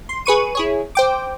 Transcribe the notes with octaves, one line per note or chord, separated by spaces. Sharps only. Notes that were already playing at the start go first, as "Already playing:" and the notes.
C6
G#4 B4 C#6 D#7
E4 G#4 C#5
C5 G5 D6